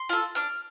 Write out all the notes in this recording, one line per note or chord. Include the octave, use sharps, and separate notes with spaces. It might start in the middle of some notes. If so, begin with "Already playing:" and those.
Already playing: C6
F4 A4
D4 F6